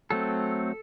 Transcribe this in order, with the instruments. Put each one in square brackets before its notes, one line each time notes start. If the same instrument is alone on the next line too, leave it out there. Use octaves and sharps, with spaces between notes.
[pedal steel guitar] F#3 A3 C4 A4